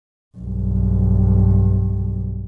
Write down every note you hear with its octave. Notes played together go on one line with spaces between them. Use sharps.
B1 G2